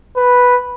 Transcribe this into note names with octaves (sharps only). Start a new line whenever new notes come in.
B4